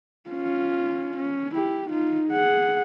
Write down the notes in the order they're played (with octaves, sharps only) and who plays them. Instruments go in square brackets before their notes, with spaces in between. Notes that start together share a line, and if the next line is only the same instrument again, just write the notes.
[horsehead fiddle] C#4 F4
C#4
E4 G4
D#4 F4
G#4 F#5